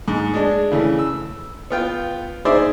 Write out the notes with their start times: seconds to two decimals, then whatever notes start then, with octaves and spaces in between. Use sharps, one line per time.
0.08 G#2
0.34 G#3 D4
0.72 C#3 E3 A3
0.99 E6
1.70 B3 F4 G5
2.45 D#4 G#4 C5 D5 E5